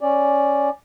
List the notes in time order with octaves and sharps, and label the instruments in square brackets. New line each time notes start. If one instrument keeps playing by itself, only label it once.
[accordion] C#4 D5